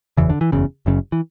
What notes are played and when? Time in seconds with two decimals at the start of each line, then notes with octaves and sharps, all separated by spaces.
0.17 F#1 E2 C#3 E3
0.30 D3
0.41 E3
0.52 F#1 E2 C#3
0.86 F#1 F#2 C#3
1.12 E3